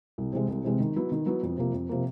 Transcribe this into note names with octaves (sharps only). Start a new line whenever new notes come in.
C2
C3 E3 G#3 C4
C2
C3 E3 G#3 C4
D#3
F#3 B3 E4
D#3
F#3 B3 E4
F2
C3 F3 A#3
F2
C3 F3 A#3